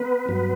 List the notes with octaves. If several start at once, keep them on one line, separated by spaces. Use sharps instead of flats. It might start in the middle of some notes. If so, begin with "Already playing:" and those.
Already playing: B3 B4
G2 F#3 B3